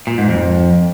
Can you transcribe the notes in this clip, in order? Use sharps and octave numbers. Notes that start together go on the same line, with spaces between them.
A#2
G#2
F2